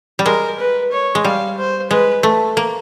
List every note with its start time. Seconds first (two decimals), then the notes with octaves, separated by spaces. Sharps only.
0.19 G3
0.26 G#3 A#4
0.59 B4
0.92 C#5
1.15 G#3
1.25 G3 F5
1.58 C5
1.90 G#3 B4
2.23 A3
2.57 A#3